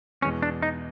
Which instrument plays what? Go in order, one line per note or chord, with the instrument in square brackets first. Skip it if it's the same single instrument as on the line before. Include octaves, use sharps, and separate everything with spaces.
[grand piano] E2 B2 G#3 [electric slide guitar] C#4
[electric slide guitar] D4
D#4